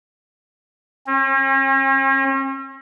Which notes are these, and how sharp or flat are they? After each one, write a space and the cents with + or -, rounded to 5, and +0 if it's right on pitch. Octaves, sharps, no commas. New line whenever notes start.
C#4 -45